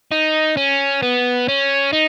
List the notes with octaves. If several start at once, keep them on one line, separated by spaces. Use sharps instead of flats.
D#4
C#4
B3
C#4
D#4